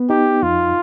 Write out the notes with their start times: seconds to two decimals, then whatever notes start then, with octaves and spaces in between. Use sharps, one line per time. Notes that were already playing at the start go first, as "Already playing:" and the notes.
Already playing: B3
0.10 D#4 G4
0.43 F2 F4